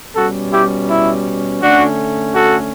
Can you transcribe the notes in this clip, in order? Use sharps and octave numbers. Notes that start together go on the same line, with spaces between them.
B2 G3 C#4 F#4 A4
E4 G4
E4
D3 A3 C#4 D4 F#4
F#4 A4